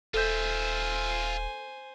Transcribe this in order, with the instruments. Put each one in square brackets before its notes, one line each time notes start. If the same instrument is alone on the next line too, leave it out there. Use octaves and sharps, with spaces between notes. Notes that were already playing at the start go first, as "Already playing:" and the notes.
[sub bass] D#1 [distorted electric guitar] F4 E5 [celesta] A4 G6 [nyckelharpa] C5 G#5